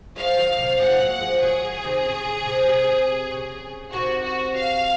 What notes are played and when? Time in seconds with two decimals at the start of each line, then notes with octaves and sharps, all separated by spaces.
0.16 F3 G#3 F5
0.37 D#3 F#3
0.58 C3
0.79 F3 G#3 F#5
1.00 F#3 A#3
1.11 F#5
1.21 F3 G#3
1.41 D#3 F#3 G#4
1.84 C3 D#3
2.05 C#3
2.25 C#3
2.46 C3
2.68 C3
3.31 C#3
3.93 C3 D#3 F#4
4.24 F#4
4.55 F5